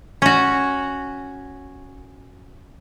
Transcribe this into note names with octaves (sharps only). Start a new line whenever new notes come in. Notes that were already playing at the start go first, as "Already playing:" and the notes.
C#4 F#4